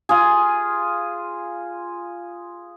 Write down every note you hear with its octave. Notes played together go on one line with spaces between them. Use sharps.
F4 G#4